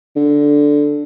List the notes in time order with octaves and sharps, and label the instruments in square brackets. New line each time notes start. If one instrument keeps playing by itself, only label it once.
[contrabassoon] D3